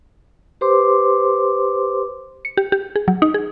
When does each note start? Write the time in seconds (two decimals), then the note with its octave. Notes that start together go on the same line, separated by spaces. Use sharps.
0.61 G4 B4 C5 C6 D6
2.45 C#7
2.57 G4
2.72 G4
2.96 G#4
3.08 F#3
3.22 D#4
3.34 G#4